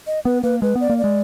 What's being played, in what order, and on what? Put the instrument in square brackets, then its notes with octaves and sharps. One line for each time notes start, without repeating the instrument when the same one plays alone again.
[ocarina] D#5
[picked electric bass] B3 [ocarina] B4
[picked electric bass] A#3 [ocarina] B4
[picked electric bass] G#3 [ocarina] B4
[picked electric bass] B3
[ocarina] D5
[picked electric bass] A#3
[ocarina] D5
[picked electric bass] G#3